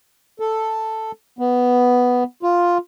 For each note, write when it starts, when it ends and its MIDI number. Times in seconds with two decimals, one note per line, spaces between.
0.40 1.12 69
1.39 2.24 59
2.43 2.78 65